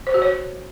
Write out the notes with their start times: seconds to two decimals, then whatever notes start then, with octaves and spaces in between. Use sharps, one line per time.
0.07 C5
0.14 F#4
0.22 C#5